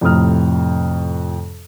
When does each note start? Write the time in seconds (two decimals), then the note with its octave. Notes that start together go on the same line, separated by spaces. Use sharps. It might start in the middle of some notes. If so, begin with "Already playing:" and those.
0.01 F2 A2 C3 A#5 D#6 F6